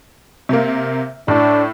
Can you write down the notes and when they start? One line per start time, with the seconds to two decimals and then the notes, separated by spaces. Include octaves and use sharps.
0.49 C3 A#3
1.28 A2 D4